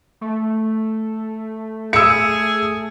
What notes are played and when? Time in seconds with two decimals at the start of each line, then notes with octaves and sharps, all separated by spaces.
0.21 A3
1.93 G#4 E6 C#7